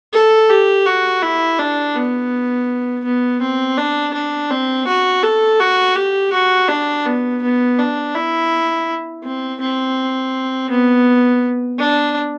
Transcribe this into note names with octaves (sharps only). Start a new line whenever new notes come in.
A4
G4
F#4
E4
D4
B3
B3
C4
D4
D4
C4
F#4
A4
F#4
G4
F#4
D4
B3
B3
D4
E4
C4
C4
B3
D4